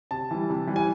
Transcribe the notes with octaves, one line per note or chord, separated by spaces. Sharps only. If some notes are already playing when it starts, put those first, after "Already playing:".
C3 A5
E3 G3
C3
E3 G3
G#5